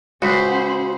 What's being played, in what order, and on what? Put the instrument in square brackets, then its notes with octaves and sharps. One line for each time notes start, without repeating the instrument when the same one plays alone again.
[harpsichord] C#2 [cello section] C#4 C5 [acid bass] F#4 [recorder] B5